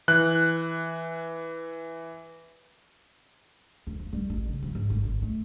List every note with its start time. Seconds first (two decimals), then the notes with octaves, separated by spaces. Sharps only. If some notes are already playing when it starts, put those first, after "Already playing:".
0.08 E3 F#6
3.87 D2
4.00 F3
4.13 G3
4.30 A1
4.49 C#3
4.63 F3
4.75 G#2
4.90 G1
5.04 G#1
5.22 A3